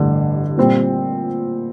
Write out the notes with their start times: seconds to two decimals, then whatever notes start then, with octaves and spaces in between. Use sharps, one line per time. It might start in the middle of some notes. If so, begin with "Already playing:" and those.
Already playing: A1 G2 D3
0.58 A#2 G3 C4